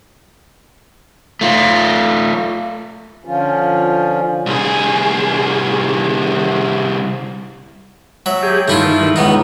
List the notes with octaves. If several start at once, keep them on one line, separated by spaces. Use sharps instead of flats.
A3 F4
D3 F3 C#4 F4
C2 G#4
F#3 E5
G4 G#4
G2 D#3 A3 E4 F4
C#2 B3 D#4